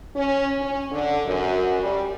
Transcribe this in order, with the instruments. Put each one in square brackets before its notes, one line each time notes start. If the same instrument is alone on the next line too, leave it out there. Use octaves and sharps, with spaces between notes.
[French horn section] C#4
C#4
D3
F#2
G3